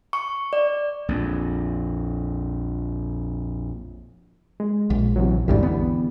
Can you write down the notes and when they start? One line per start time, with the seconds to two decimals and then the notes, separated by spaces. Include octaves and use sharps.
0.13 C#6
0.53 D5
1.09 A#1 F2
4.60 G#3
4.90 A#1
5.16 C3 E3 F#3
5.48 A1 E2 G#2 D3 E3 G3
5.63 B3